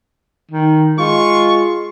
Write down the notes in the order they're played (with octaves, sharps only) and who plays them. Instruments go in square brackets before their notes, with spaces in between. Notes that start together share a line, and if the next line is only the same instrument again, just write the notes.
[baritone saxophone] D#3
[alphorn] G#3 [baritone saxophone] F4 [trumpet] C#6